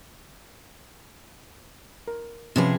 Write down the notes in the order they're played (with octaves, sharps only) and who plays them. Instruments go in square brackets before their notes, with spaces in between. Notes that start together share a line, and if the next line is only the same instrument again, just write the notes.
[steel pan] A#4
[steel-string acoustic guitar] C3 F3 G#4 [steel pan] C4 C#4 B4